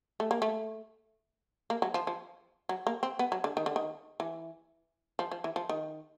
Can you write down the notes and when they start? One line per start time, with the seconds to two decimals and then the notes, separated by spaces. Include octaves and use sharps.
0.20 A3
0.31 A#3
0.42 A3
1.70 A#3
1.82 F#3
1.94 F3
2.07 F3
2.69 F#3
2.87 A#3
3.03 C4
3.19 B3
3.32 F#3
3.44 D3
3.57 D#3
3.66 D3
3.76 D#3
4.20 E3
5.19 F3
5.32 F3
5.44 E3
5.56 F3
5.69 D#3